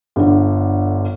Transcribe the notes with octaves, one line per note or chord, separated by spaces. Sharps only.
G1 D3